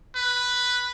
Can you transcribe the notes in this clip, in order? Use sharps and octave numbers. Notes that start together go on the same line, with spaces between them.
B4